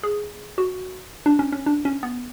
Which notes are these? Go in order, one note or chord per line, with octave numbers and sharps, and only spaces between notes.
G#4
F#4
D4
C#4
C#4
D4
C#4
B3